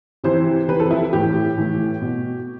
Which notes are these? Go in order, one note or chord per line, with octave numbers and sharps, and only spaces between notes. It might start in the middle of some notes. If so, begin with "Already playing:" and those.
C3 E3 C5
C3 E3 B4
A4
E4
A2 E3 G4
A2 E3
B2